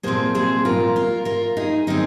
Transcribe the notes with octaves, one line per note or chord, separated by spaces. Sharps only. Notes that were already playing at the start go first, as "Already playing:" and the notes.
A#2 F3 C4 G#4 C5
G#4 C5
F4 A#4
F4 A#4
F4 A#4
D#4 G#4
D#3 C4 D#4 G#4